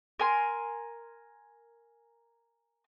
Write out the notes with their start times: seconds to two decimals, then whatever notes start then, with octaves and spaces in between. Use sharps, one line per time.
0.19 A#4 G#5 C6